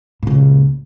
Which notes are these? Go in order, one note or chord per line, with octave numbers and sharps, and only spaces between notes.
C#2 A#2